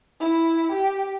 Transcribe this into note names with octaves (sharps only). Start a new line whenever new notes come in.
E4
G4